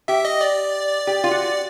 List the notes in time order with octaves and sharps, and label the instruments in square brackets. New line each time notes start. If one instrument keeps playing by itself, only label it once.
[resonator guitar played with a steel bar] G4 [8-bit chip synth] E5
[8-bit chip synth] D#5
D5
[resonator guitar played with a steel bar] G4
F4
F#4